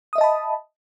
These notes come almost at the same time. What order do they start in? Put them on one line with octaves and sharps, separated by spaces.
D#6 E5 D#5 A5 B5